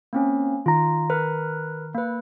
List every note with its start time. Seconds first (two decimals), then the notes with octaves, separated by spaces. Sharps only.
0.13 A#3 C4 C#4
0.66 D#3 F4 A#5
1.10 A#4 B4
1.94 A#3 B4